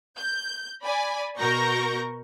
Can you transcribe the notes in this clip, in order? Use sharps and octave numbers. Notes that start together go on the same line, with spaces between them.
G6
D5 G#5 B5
B2 F#4 A#4 C#6 G6 A#6